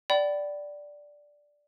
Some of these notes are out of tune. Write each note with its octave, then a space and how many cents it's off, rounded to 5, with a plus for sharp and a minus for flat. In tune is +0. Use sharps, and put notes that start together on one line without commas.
D5 +0 G5 -40 B5 +10